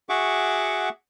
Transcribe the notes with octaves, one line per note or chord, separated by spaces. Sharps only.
F#4 G#4 E5 F#5 C#6 D6